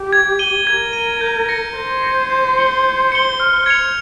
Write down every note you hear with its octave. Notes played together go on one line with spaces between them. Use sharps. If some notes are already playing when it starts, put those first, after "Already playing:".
Already playing: G4
G#6
D#7 G7
A#4 G#6
D#7
G7
G6
A#6 C#7
C5 G6
A#6 C#7
G6
C#7 G7
G6
C#7 G7
F6
G#6 C#7 F7